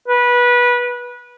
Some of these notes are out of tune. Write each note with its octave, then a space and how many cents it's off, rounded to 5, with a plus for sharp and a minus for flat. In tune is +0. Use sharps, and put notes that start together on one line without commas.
B4 -20